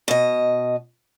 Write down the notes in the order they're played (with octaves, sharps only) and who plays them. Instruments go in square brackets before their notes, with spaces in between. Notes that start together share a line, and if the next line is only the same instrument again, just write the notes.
[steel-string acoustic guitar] B2 D#5